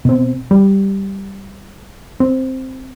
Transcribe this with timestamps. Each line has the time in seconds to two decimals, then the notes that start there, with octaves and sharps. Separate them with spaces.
0.05 B2 C4
0.51 G3
2.20 C4